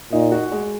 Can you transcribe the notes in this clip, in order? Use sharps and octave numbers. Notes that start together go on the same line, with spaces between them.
A#2 D#4
F#4
G#3